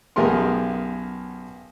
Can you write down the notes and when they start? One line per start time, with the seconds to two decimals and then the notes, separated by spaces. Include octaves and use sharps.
0.16 B1 F#2 G4 G#4 A#4 C6